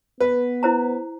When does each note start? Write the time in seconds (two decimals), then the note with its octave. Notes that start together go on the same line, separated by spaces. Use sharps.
0.20 B3 B4
0.63 E4 C5 A#5